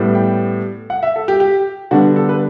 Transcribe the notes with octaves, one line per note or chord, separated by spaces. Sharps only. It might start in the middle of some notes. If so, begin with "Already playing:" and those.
Already playing: A2 G3 B3
G5
F#5
E5
A4
G4
G4
D3 G3 B3 D4 F#4
A4
B4